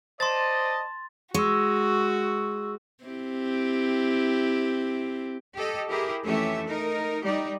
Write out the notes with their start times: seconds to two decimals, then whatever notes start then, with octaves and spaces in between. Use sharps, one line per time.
0.20 C5 D5 D#5 A5 C6 A6
1.34 G#3 F#4 C#6 E6
3.04 C4 E4 G4
5.55 G4 A4 D#5
5.90 E4 G4 G#4 A#4
6.25 F2 E3 A3 C#4 G4 E5
6.65 D#4 A#4
7.24 G3 D#4 G4 D5